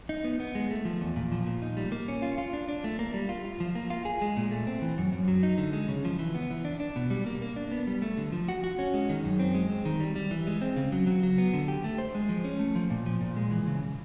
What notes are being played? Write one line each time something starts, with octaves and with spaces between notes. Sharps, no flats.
D#4
B3
B3
G#3
A3
F3
E2
A#2
F3
A#2
D#4
G3
A#3
C#4
F4
F4
D4
D4
A3
A#3
G3
F4
F4
F3
A#3
F4
G#4
G#3
A#2
A3
C4
E3
F#2
F#2
F#3
D#4
D3
G#3
C#3
F3
E3
B3
E3
D4
D4
B2
G3
A#3
A#3
D4
B3
G3
A3
D3
F3
F#4
F#4
C#4
G#3
D#3
F#2
C4
G#3
C4
D#3
G3
G3
E3
G#3
C4
C#3
F#3
F#3
F#3
B3
D3
G4
A3
C5
G#3
F3
C#4
A3
F3
A#2
F3
A#2
G#3
E3
C#3